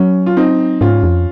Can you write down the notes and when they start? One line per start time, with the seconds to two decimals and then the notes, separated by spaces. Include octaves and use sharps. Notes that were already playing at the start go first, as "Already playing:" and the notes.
Already playing: F#3 C#4
0.26 F4
0.37 C4 D#4
0.81 G#2 C#4 F4
1.03 F2